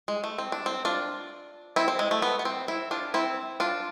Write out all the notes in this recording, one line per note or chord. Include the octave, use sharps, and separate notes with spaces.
G#3
A3
C4
D4
C4
D4 F4
C4 E4
C4
G#3
A3
B3
B3
C4
C4 E4
D4 F4
C4 E4
D4 F4